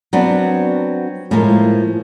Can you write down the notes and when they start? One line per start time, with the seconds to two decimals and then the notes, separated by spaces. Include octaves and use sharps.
0.13 F#3 B3 C4 D4
1.31 A2 F3 G#3 A#3